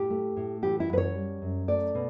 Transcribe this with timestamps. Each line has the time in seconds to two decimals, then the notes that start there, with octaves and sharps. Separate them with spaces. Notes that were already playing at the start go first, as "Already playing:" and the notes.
Already playing: A2 G4
0.10 A3
0.37 A2
0.62 E3 G4
0.80 E4
0.89 F#2 B4
0.98 C#5
1.15 G3
1.42 F#2
1.68 A3 D5
1.95 B2